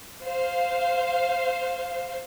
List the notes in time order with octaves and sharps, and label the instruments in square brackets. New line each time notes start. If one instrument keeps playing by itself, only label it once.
[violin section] C5 F5